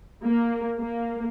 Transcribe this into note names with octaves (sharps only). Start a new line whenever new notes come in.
A#3
A#3